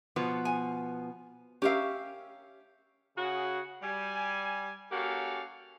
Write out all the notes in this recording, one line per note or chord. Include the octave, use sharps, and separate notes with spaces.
B2 F3 B3
G#5
C#4 G4 A#4 E5 F5
C#3 F#4 G#4
G3 G#5
A#3 C#4 F#4 G4 A4 F5